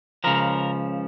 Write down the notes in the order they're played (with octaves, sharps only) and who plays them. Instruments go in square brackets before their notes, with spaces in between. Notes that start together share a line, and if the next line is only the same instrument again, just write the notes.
[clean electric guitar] C#2 C#3 F3 A#4